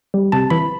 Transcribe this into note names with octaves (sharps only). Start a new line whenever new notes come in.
G3
C3 A5
E3 B5